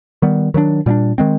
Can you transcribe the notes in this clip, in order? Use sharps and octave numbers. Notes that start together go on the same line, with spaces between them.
D#3 G3 B3
D#3 F#3 A#3 D4
A#2 G3 B3 D4
D#3 G#3 C4